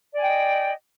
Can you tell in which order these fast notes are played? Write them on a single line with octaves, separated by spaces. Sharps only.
D5 G#5 G5 D#5